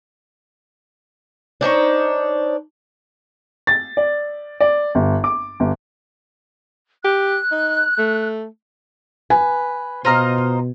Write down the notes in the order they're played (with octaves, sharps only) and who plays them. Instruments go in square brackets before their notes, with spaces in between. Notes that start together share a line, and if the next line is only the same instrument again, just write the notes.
[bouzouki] D4 D#4 C5 C#5
[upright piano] A6
D5
D5
G1
D6
G1
[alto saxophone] G4 [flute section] F#6
[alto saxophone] D#4
A3
[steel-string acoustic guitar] B4 [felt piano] G#5
[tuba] B2 [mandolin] F4 A#5 F6 [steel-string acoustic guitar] C5 D#5